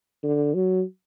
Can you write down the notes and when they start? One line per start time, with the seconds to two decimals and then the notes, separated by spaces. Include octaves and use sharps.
0.23 D3
0.54 F#3